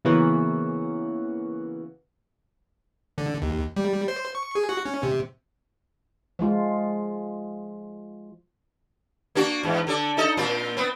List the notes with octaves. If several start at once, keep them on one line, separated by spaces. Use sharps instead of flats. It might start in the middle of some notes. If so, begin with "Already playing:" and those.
C#3 E3 A#3 B3 F#4
D3
D#2
G3
C5
C#6
G#4
F#4
C#4
C3
F3 G#3 F4
A#3 D4 F#4
E2 G#2
D3 A4 D5
D#4 A4 D#5
A#2 C4 F4
B3 C4